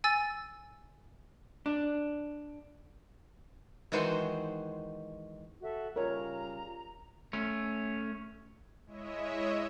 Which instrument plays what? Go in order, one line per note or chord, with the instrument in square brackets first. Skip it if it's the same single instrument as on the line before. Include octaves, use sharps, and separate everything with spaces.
[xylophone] G#5 E6 A6
[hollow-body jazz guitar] D4
[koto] D#3 E3 G#3 F#4 C5
[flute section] F#4 A4 E5
[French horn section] C#3 G3 F4 [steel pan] A#4 C#5 [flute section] A#5
[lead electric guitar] A3 C#4
[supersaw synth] G#3 E4 C#5 D#5 E5